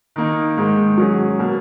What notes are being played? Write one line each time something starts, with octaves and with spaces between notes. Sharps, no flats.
D#3 A#3 D#4
G#2 D#3 G#3
F#3 C#4 G#4
B2 A#3